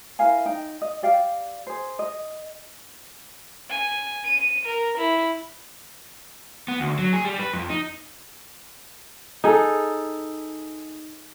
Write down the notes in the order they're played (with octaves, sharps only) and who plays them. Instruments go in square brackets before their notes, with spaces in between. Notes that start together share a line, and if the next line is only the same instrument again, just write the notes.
[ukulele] E4 A#4 F5 G#5
D#4 G5
D#5
G4 D5 F5 G5
G#4 C5
D#5
[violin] G#5
D#7
A#4
E4
[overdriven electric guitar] B3
D2
F#3
G#4
G3
B4
F2
D#4
[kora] D#4 G#4 A4